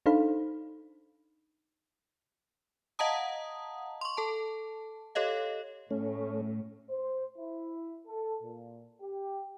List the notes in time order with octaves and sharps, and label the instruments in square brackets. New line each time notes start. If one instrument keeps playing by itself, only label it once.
[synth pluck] D4 D#4 A4 C5 F5 B5
[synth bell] D#5 F5 F#5 A5 A#5 D#6
C6 C#6
A4 A5
G4 A4 C#5 D#5 F5
[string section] A2 [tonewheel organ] A3 C#4
[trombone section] C5
E4
A4
A#2
G4